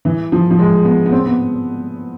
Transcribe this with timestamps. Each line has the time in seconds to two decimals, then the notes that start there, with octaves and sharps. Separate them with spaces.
0.05 E3
0.32 F3
0.51 F3
0.59 G#3
0.85 B3
1.06 B3
1.12 C4
1.26 B3